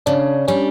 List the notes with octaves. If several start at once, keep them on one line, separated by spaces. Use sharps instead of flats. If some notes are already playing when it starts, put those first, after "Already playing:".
C#3 D4
G3 C#4